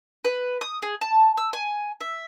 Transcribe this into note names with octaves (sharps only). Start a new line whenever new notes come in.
B4
D#6
G#4
A5
E6
G#5
E5